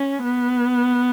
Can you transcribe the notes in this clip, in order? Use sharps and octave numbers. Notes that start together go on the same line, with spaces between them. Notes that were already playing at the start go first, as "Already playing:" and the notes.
Already playing: C#4
B3